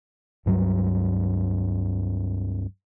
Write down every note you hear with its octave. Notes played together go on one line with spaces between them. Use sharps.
C#2 G2 F#3 G3